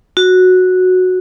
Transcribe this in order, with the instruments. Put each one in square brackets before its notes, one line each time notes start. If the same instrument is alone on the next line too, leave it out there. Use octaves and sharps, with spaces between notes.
[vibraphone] F#4